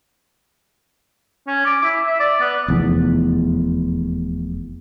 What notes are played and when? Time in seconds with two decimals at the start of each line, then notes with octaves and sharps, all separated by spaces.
1.47 C#4
1.66 D6
1.84 E4
2.07 E5
2.20 D5
2.41 B3
2.68 F1 E2